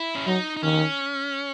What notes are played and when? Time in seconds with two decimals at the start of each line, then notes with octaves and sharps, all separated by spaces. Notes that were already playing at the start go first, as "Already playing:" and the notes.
Already playing: E4
0.15 C#4
0.26 F#3 D#4
0.57 D#4
0.63 D#3 C#4